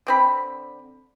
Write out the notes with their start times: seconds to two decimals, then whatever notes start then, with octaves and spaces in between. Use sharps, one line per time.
0.07 D3 C4 B5